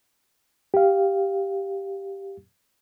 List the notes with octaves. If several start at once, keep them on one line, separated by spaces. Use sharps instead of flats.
G4 F5